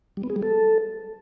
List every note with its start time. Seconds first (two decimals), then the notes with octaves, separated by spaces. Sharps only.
0.17 G3
0.23 B3
0.30 G#4
0.36 G3
0.42 A4